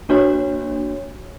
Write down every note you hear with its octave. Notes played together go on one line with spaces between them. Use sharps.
A#3 D4 F#4 C#5